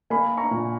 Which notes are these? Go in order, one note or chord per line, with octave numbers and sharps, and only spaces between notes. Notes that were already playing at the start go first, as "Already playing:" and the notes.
A#3 G#5 B5
A#5 C#6
A#2